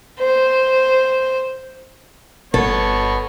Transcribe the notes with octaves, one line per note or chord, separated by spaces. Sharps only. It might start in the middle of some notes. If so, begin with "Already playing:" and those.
C5
G1 B3 A4 C#5